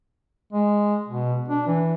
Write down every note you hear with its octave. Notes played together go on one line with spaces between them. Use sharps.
G#3
B2
D4
E3